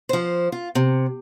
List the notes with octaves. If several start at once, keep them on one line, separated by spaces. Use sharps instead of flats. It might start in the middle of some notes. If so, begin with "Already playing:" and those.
F3 C5
F4
C3